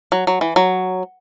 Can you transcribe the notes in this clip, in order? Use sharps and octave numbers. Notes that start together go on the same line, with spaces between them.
F#3
F#3
E3
F#3